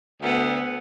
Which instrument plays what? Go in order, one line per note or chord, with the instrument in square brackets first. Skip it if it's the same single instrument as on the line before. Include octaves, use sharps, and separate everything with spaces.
[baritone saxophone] D2 [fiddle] B3